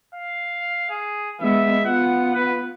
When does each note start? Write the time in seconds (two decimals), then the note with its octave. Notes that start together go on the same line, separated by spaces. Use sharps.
0.15 F5
0.90 G#4
1.41 G#3 B3 E5
1.85 B3 F4 F#5
2.35 B4